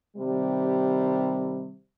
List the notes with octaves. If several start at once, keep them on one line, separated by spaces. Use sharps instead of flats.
C3 D#3 G3